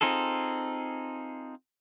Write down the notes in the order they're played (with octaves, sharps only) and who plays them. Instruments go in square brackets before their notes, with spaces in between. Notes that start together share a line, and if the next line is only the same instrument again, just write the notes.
[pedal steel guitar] C4 D#4 F4 G#4 A4